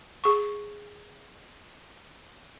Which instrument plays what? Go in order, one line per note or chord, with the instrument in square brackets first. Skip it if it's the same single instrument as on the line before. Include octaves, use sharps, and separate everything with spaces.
[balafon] G#4 C#6